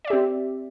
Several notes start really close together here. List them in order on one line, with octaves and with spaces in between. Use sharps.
D5 E5 G4 C4